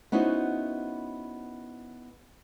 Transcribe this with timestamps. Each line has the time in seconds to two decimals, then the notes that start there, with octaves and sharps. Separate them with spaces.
0.12 B3 C#4 D#4 E4 F#4 C5